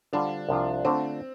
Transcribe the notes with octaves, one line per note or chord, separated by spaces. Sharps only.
D3 G3 D4 F4 C5
C2 C3 F3 D4 F4
D3 A3 C4 D4 F4